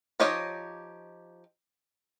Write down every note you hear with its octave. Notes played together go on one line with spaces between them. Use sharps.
F3 D#4 G4 C#5 D#5